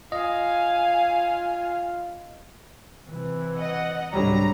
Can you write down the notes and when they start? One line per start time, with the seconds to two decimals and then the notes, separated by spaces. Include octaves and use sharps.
0.12 F4 D#5 F5 G#5
3.08 C3 E3
3.57 D#5 F#5
4.13 C2 G#2 D3 F#3 G3 A#5